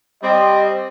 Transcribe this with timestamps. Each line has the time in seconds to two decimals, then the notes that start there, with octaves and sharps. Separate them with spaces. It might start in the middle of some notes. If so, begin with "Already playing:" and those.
0.23 G3 C4 D#5